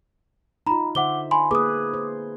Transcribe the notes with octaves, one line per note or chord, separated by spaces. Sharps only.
D#4 F4 A#5 B5
D3 C5 E5 F#5 D6 G7
G#5 B5 C6
A#3 G#4 B4 D6 D#6
C5